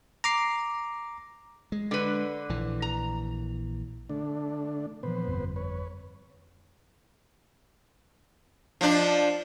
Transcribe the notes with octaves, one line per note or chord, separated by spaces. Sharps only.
A#5 D6 C7
G#3
D3 B4
A#1 E3
A#5
D3 A3 D4
A#2 E3 F3 B3 B4 C5
G1 F2 G3
B4 C#5
F3 D4